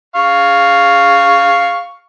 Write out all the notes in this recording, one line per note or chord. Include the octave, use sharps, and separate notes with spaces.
F5 C#6